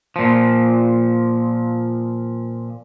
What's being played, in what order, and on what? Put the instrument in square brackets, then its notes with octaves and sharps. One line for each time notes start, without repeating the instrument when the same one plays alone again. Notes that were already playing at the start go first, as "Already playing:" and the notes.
[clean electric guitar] A#2 F3